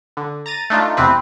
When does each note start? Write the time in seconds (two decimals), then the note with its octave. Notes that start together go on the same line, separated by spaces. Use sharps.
0.17 D3
0.46 A#5 A6 D#7
0.70 A3 D4 D#4 F4
0.97 E2 C3 C4 B4